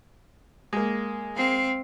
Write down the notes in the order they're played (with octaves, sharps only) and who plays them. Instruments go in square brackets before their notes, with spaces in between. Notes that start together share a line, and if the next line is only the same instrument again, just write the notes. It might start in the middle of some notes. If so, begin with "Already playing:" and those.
[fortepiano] G#3 A#3
[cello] C4 F5